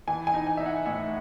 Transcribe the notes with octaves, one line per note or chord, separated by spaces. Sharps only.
E3 G#5
G#5
D#4
G#5
D#4 E5
F#5
A2 E5